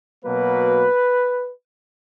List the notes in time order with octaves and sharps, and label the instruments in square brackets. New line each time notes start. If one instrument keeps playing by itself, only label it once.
[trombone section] B2 F#3 A#3 B4